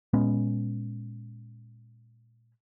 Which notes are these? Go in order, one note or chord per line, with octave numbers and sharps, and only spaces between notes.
A#2 G#3 B3 C#4